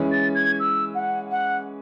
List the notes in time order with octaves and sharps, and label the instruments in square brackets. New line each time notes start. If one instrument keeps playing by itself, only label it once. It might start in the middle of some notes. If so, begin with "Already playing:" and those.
Already playing: [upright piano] E3 G#3 C#4
[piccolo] A6
G#6
E6
F#5
F#5